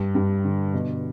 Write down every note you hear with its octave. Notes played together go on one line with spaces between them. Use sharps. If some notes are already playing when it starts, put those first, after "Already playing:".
Already playing: G2
G2
D3
B2